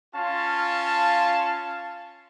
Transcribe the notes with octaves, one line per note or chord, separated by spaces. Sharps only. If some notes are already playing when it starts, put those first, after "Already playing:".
C#4 F4 F5 A5